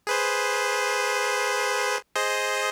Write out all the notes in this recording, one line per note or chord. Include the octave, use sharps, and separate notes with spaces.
G#4 B4 C5
G#4 C5 D#5